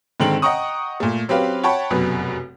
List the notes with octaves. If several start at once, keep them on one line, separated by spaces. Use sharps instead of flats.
G#2 D3 D#3 C4 G5 F#7
D#5 F#5 G5 A#5 C#6 D#6
A#2 A3
F#3 C4 C#4 G4 B4 F5
C#5 F#5 G5 A5 B5 C#6
F1 F#2 B2 B4